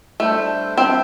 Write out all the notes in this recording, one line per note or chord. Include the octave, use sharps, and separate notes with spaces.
G3 A3 D4 C5 E5
G3 C4 D4 C5 E5